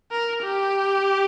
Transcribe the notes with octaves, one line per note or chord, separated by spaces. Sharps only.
A#4
G4